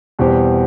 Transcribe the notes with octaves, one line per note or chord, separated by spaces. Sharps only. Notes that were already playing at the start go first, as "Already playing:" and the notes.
E2 B2 G3 C4 G4